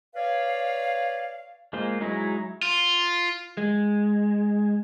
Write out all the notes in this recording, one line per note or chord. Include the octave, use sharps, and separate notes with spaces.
B4 C#5 D5 F5
G#3 A#3 F4 C5
F#3 G#3 D#4 E4
F4
G#3